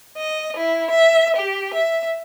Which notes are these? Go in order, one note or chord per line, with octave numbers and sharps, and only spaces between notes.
D#5
E4
E5
G4
E5